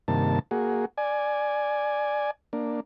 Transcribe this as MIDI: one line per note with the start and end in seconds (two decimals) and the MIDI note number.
0.08 0.39 43
0.08 0.39 48
0.08 0.39 51
0.08 0.39 58
0.08 0.39 81
0.51 0.85 58
0.51 0.85 66
0.51 0.85 68
0.97 2.31 74
0.97 2.31 80
2.53 2.80 58
2.53 2.80 62